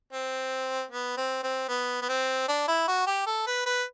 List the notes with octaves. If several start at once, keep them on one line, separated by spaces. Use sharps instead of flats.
C4
B3
C4
C4
B3
B3
C4
D4
E4
F#4
G4
A4
B4
B4